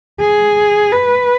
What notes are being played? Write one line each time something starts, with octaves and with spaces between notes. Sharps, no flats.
G#4
B4